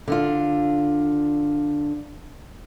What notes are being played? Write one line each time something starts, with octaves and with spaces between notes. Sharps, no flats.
D3 D4 F4